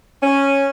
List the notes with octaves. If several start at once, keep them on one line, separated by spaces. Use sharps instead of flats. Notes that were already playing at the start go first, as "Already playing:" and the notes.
C#4